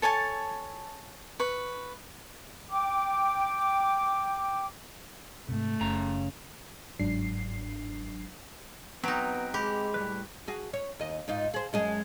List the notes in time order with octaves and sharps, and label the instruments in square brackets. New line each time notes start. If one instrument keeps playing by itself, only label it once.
[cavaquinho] A4 C#5 G#5 A5
B4 C#6
[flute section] G5 D6
[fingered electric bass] G#2 C3 [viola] A3
[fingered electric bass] F#1 [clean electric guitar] C#3 A#5
[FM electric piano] G1 G#2 F#3 D4 C7
[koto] F#3 D#4 [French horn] B3 [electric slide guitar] C4 B4 G5
[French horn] G#3 [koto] G4 [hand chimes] G#4 B5
[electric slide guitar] A2 G3 B4
[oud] F#4 G#4
C#5
D#2 D#5
G#2 D#4 F4
G#4 C5
F#2 G#3 G#4